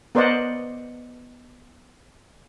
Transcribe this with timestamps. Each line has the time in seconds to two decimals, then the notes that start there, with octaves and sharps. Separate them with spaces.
0.15 B3 A#4 C5 D5 D#5 F#5